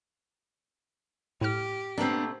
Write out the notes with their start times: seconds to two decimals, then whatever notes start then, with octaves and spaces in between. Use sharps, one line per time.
1.41 A2 G4 F6
1.98 A#2 A3 B3 C4 D4